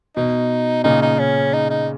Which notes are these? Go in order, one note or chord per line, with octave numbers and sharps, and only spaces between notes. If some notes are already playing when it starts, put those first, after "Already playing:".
B2 D#4
A#2 C#3 D#4
D#4
C#4
D#4
D#4